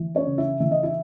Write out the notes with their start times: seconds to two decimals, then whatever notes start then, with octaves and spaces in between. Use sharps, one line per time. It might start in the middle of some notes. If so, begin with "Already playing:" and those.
Already playing: E3
0.15 C#4 C#5
0.27 C#3
0.38 E4 E5
0.60 E3 E5
0.71 D#5
0.83 E4 E5